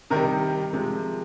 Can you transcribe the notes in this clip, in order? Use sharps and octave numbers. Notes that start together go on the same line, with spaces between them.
C3 D#3 G3 A#4
C3 F3 G#3